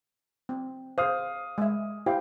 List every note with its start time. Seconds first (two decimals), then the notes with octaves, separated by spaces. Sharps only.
0.49 C4
0.98 G#4 C5 F5 D#6 F6
1.58 G#3 E5
2.06 E4 G4 C5 F5 G5